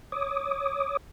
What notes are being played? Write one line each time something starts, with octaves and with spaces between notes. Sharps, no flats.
C#5 D6 D#6